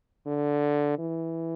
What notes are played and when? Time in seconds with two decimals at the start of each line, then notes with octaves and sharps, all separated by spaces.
0.27 D3
0.99 E3